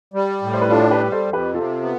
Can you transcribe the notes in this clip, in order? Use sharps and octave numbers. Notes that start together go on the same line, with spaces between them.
G3
A2
C5
B4
D4 F4 A4
G4 B4
G3
A4 C5
F2
G4 B4
C3 F4 A4
B3